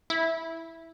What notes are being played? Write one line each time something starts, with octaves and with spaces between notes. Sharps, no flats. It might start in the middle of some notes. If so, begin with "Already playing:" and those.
E4